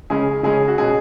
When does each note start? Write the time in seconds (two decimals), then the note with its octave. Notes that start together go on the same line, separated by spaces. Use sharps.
0.10 C#3 G#3 C#4 G#4
0.43 C#3 G#3 C#4 G#4
0.68 F#4
0.78 B2 G#3 C#4 G#4